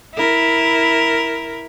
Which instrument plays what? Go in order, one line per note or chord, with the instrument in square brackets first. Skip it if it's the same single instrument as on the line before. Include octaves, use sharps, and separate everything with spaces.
[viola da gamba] E4 A#4